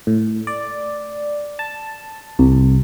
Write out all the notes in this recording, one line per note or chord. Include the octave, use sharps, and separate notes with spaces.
A2
D5
A5
C2